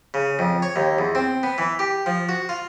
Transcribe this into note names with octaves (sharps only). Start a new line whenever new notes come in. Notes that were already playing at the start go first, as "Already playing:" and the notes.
C#3
F2
C#5
D#2
E2
C4
B3
E3
G4
F3
F#4
F4